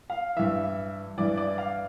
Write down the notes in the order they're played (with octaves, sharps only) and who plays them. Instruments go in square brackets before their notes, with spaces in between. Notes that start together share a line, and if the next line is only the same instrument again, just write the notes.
[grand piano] F5
G2 E3 E5
G2 E3 D5
D5
F5